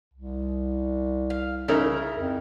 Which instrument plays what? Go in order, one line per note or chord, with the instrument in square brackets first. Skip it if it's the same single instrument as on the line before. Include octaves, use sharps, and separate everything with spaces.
[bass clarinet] C2
[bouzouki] F5
[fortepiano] C#3 D#4 A#4 [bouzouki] E4
[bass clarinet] F2